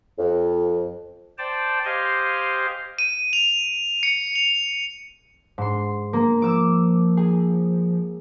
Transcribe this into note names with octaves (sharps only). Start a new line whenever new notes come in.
F2
C5 D5 G5 A5
G4 C5 D#5 F5 G#5
D#7
F7
C#7
F7
G#2 C6
A#3
F3 D6 E6
G#4